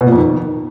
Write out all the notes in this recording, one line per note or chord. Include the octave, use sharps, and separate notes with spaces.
B2
A#2
F2
D#3